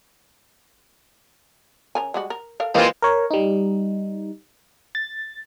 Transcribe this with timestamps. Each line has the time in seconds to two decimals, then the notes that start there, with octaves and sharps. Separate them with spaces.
1.95 C#3 A#4 G#5
2.14 G3 G#3 F#4
2.30 A#4
2.60 A4 A#4 F5
2.75 E3 G3 G#3 A#3 C4 F4 C5 F5
3.02 A#4 C#5
3.31 G3 D#4
4.95 A6